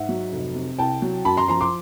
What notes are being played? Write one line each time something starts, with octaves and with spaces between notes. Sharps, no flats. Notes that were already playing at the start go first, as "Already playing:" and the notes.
Already playing: G#2 E5 F#5
F#3
F1
C3
C2 G5 A5
F#3
F#2 A5 B5
A#5 C6
F3 A#5 C6
C6 D6